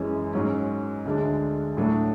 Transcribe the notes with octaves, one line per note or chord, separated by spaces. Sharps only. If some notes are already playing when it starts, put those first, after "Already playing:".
Already playing: F#2 E3 G#3 C#4
G#2 F#3 C#4
D2 D3 G#3 D4
A2 F#3 A3 D4